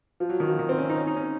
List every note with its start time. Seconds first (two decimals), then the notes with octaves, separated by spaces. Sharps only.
0.20 F3
0.29 F#3
0.40 D#3
0.49 F3
0.59 D#3
0.69 C4
0.78 C#4
0.90 D#4
0.97 C#4
1.07 D#4
1.16 C#4